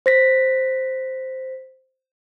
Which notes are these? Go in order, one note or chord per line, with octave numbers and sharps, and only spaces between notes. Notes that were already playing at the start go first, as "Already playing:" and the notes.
C5 A#6 B6